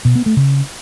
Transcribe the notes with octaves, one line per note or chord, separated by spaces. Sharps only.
B2
B3
A3
C#3